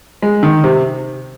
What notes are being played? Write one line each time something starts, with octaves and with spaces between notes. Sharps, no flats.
G#3
D#3
C3